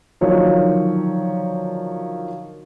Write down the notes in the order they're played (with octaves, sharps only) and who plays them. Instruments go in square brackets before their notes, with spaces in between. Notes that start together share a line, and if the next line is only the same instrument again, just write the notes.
[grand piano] D3 D#3 F3 F#3 C#5